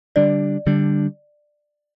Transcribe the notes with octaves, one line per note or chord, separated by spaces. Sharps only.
D3 G3 D4 D5
D3 G3 D4